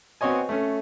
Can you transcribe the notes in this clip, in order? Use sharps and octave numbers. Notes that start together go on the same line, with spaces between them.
B3 C4 F#4 C#5 D#5 G#5
A3 C#4